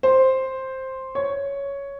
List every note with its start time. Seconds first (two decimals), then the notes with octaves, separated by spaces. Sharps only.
0.03 C5
1.15 C#5